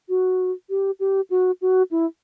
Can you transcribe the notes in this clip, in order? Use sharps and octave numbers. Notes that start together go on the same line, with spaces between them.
F#4
G4
G4
F#4
F#4
E4